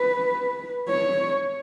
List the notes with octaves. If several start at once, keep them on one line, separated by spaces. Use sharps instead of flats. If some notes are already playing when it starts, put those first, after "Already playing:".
Already playing: B4
C#5